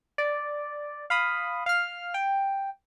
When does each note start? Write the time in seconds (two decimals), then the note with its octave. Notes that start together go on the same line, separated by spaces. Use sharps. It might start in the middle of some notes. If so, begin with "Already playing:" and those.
0.18 D5
1.10 F5 B5 D#6
1.66 F5 F6
2.14 G5